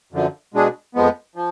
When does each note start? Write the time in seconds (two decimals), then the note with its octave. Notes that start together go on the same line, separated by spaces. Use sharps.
0.13 F#2 D3 F3
0.54 B2 G#3 D4 G#4
0.95 F2 F3 G#3 B3
1.36 F3